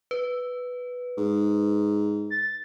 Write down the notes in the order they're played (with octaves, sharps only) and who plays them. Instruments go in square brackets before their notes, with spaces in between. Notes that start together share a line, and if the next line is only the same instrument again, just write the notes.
[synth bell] B4
[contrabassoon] G#2
[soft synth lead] A6